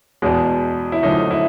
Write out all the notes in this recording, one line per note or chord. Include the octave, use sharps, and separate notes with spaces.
E2 B2 G#3
E4
F#2 D3 F3 A3 D#4
E4